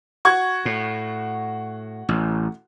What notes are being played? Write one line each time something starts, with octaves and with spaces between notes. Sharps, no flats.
F#4 C#6 G#6
A2
A1